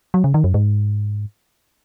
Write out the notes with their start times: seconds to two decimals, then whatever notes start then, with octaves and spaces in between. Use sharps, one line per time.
0.14 F#3
0.24 C#3
0.34 D#3
0.44 F#2
0.54 G#2